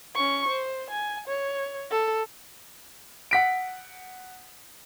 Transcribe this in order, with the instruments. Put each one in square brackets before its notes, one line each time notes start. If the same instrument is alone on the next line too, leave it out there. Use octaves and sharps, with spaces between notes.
[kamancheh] C#4 C#6
C5
G#5
C#5
A4
[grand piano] F#5 B6 D7